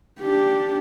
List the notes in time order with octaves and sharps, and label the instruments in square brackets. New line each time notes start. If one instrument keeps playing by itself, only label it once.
[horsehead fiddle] D4 G4